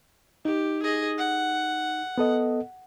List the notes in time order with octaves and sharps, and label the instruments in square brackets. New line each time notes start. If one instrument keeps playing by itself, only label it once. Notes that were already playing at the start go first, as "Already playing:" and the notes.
[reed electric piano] D#4 [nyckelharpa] G4
[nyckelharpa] G#4 D#5
F#5
[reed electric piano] B3 A4 D#5